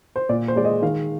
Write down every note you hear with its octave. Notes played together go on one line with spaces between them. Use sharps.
C5
A#2 D5
C5
G#3 D5
D#5
D#3 F5